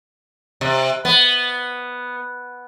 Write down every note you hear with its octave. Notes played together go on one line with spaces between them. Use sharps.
C3
B3